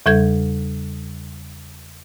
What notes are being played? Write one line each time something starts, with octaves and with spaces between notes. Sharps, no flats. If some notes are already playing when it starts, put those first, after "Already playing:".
E2 C#3 G3 A4 G6 G#6